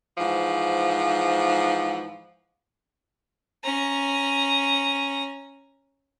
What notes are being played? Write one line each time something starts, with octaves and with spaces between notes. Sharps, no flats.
G#2 E3 F3
C#4 A#5